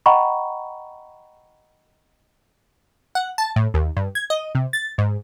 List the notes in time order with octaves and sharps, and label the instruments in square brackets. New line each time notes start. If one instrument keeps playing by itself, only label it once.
[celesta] D#5 F#5 G5 A#5 B5 C#6
[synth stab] F#5
A5
A2
D#2
G2
G#6
D#5
C3
A6
G#2